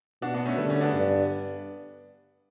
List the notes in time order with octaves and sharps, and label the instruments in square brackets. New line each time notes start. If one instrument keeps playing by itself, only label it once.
[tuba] B2 [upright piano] D4 F#4
[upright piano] B3 D4
A3 C#4
[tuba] D3 [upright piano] G3 B3
[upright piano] A3 C#4
B3 D4
[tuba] G2